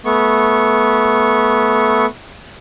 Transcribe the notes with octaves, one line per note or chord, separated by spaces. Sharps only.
A3 B3 C#6